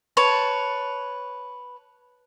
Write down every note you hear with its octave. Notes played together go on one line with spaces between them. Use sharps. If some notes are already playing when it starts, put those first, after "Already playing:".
B4 C#5 A5